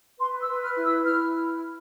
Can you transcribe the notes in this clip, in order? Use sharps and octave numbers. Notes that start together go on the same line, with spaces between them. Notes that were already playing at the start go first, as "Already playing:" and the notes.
B4 C6
E6
B4
F6
E4
E6
E4 F6